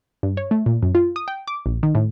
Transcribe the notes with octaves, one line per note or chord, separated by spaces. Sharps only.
G2
C#5
A3
A#2
F#2
F4
D#6
G5
D6
A#1
D#3
A2